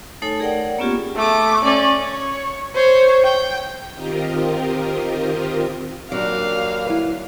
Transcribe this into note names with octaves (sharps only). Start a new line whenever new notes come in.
A3 D#4 A4 C#5 G#5
G#4 A#4 D5 F#5 G5
A#3 B3 C#4 F4 G4 G#4
A3 D6
C#4 D5
C#5
C5 C#5
G5
D#3 C4 F4 G4 A#4 D#5
D#2 F#3 A#3 D4 F5
E4 B4